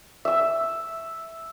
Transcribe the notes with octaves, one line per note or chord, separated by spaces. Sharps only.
E5 E6